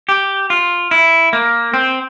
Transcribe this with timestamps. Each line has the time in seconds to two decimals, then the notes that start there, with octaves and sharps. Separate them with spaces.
0.09 G4
0.50 F4
0.91 E4
1.33 A#3
1.74 C4